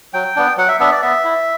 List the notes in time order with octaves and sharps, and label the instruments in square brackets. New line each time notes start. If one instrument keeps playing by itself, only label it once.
[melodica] F#3 G5
B3 D4
F#3 F#5
E5
B3 D4 E5
D5
B3 E5
E4